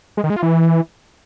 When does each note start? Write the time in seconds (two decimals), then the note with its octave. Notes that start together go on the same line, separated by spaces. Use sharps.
0.17 G#3
0.24 D#3
0.30 G#3
0.36 F4
0.43 E3